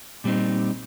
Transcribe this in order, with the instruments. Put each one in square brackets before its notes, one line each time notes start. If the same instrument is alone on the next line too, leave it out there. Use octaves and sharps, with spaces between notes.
[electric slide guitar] A#2 G3 C4 D#4